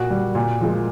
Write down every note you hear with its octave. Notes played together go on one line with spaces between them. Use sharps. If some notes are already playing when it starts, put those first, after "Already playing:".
Already playing: A#2 F#4
G3
A#2
F3 G#3